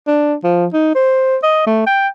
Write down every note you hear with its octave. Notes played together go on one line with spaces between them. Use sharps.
D4
F3
D#4
C5
D#5
A3
G5